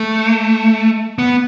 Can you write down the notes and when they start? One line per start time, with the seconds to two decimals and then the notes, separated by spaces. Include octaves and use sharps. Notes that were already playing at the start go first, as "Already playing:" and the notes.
Already playing: A3
1.18 B3